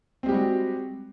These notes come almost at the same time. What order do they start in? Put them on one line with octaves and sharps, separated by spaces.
C4 G#3 G4 G3 F#4